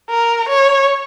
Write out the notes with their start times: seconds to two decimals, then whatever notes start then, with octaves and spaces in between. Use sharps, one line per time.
0.10 A#4
0.48 C#5